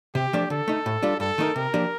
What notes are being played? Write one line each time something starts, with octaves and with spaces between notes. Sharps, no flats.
C3 G4
F3 A3 D4
D3 A4
A3 D#4
A2
G3 D4 F4
G2 A4
D#3 A3 D#4 A#4
C3 A#4
F3 A#3 D4 G4